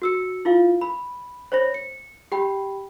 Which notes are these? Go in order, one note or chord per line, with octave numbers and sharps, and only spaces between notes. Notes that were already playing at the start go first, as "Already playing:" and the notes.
F#4 E6 C#7
E4 F4 F5
B5
C5 C#5 B5 A#6
C#7
G4 G5 B5